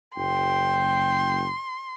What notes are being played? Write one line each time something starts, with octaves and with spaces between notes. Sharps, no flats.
F#1 G5 C6